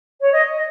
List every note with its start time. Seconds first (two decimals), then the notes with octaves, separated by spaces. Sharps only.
0.21 C#5
0.32 D#5
0.54 D#5